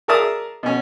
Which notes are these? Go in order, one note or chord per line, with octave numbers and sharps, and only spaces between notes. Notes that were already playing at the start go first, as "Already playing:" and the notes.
G#4 A#4 D5 E5 A5 D#6
B2 C#4